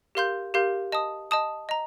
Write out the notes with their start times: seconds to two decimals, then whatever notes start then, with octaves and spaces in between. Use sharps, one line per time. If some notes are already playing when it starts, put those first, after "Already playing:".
0.15 G4 A#4 F5 C6 G6
0.54 G4 A#4 F5 C6 G6
0.92 D#5 A5 D#6
1.31 D#5 A5 D#6
1.69 D#5 A#5